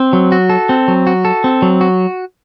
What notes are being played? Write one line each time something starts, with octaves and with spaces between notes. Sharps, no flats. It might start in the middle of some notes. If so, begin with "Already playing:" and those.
Already playing: C4
F#3
F#4
A4
C4
F#3
F#4
A4
C4
F#3
F#4